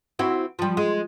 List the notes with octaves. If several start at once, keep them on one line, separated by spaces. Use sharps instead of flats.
C4 E4 F#4
F3 G3
G#3